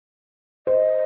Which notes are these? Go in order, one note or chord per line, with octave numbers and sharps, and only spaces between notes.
C5 D#5